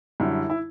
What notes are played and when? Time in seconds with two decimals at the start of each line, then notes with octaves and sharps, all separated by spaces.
0.20 F#2 D3 G3 E4
0.50 E4